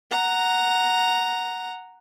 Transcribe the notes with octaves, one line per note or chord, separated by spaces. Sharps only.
F#5 A#5